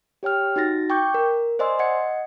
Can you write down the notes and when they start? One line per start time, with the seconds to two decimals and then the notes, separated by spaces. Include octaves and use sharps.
0.23 G4 C#5 G5 F6
0.56 D#4 F#4 A6 A#6
0.90 G5 C#6 D6 G6
1.14 A#4
1.59 C5 D5 D#5 G#5 C6 E6
1.79 D#5 F#5 G#6 C#7